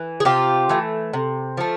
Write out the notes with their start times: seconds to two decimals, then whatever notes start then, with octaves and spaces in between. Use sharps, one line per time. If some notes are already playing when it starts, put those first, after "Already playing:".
Already playing: E3
0.20 G#4
0.25 C3 F4 G4
0.69 E3 A3
1.13 C3
1.57 F3 A3